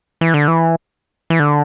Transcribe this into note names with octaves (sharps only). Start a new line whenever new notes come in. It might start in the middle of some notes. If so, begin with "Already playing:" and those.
E3
D3
E3
E3
D3